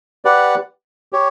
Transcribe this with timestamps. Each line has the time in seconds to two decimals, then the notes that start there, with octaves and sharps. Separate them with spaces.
0.25 G4 B4 D5 F#5
1.13 G4 C#5